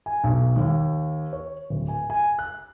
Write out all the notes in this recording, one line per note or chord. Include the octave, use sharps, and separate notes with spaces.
G#5
B1
D#2
C#5
D1
G#5
G#5
F#6